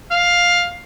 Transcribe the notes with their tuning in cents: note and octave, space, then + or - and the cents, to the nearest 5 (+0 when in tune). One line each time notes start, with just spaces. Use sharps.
F5 +10